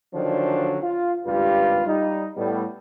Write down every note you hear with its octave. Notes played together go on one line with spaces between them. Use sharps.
D3 D#3 F3 F#3 C#4 D4
F4
G#1 C#2 G2 F4 G4 B4
G3 D#4
A2 G3 B3